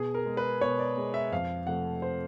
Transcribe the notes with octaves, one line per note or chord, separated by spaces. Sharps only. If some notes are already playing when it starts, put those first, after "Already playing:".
Already playing: B2 G#4
A#4
G#3
B4
B2 C#5
D5
G#3
E5
F2 F5
C3 F3 A3 F#5
C5